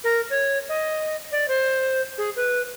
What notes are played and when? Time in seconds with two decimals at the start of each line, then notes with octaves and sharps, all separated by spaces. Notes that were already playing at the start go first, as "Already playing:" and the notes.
0.04 A#4
0.30 C#5
0.69 D#5
1.32 D5
1.48 C5
2.18 G#4
2.36 B4